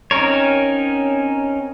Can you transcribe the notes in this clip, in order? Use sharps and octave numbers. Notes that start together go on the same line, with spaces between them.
C4 C#4 D#4 A#4 C#5